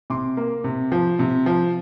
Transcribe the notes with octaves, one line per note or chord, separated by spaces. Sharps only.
C3 C6 D6
A#3
C3
F3
C3
F3